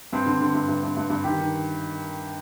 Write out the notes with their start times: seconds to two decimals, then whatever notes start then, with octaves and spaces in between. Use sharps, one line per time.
0.13 G2 C4
0.26 D3
0.41 D3
0.55 G2
0.68 G2
0.83 G2
0.97 G2
1.10 G2
1.24 D#3 G4
1.38 D#3